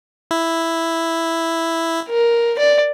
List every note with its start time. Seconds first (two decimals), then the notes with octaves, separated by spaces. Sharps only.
0.31 E4
2.08 A#4
2.59 D5